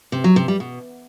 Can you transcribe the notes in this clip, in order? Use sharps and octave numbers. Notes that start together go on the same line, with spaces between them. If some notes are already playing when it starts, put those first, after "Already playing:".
C3
F#3
C3
G3
B2